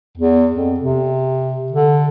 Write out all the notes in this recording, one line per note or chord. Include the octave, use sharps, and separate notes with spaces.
E2
F2
C3
D3